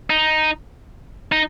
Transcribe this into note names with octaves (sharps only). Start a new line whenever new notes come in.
D#4
D#4